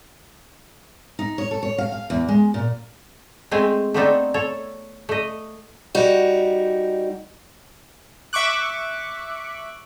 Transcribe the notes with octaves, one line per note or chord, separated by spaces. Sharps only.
D#4
C#5
A4
C#5
F5
F5
E2
G#3
A#2
G#3 A3 C4 G#5
A3 B3 C4 D4 D#4 A4
A4 C#5
A3 D#5
G3 D#4 F#4
E5 C#6 D6 F#6